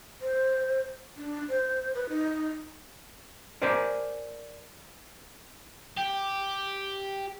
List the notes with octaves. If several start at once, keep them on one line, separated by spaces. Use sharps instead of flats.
C5
D4
C5
B4
D#4
A#4 C5 D5 G#5 A5
G4